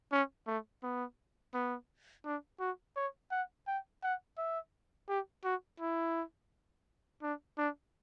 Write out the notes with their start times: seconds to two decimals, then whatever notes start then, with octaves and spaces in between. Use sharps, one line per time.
0.12 C#4
0.47 A3
0.83 B3
1.54 B3
2.25 D4
2.60 F#4
2.96 C#5
3.31 F#5
3.67 G5
4.03 F#5
4.37 E5
5.09 G4
5.44 F#4
5.80 E4
7.22 D4
7.58 D4